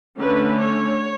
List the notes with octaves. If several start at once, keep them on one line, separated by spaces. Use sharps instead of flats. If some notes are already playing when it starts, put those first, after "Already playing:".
D3 A3 C#4 B4
C#5